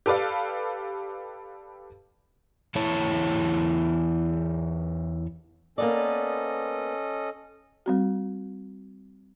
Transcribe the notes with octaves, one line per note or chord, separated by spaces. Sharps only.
G4 A4 B4 D5 F5
E2 E4 C#5 A5
A#3 B3 C#4 A4 D5 D#5
G3 C4 F#4